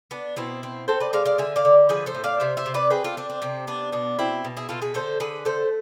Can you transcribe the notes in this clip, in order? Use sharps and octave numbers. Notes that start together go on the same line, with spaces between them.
B3 D4
B2 C4 E4
C4
C4 A4 C5
B4 D5
G#3 D5 F5
D5 F5
D3 E5 G#5
D5 F5
D3
F3 G#4 B4
A4 C5
A2
D5 F5
C3 C5 E5
C5 E5
C3
B4 D5
C4 G#4 B4
F4 A4
C4 D4
D4
C3 C4
B3 D4
B2 D4
B2 C4 E4
B2
E4 G#4
B2 F4 A4
G#4 B4
D3 A4 C5
D3 G#4 B4
A3 A4 C5